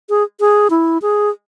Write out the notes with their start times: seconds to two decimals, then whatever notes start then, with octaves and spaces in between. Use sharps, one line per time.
0.10 G#4
0.40 G#4
0.70 E4
1.02 G#4